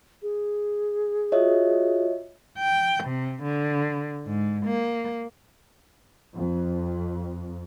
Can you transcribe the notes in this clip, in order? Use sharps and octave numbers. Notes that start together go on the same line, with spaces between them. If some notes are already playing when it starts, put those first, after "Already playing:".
G#4
F4 F#4 C#5 D#5 E5
G5
C3
D3
G#2
A#3
F2